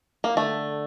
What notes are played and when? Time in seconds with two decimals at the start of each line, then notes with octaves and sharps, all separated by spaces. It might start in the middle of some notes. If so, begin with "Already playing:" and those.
0.24 A#3
0.37 D3 A3